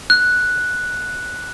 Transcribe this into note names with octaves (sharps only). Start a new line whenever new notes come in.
F#6